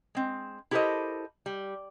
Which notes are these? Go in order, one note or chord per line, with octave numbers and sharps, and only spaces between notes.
G#3 C4
E4 G4 A4 A#4 C5 D#5
G3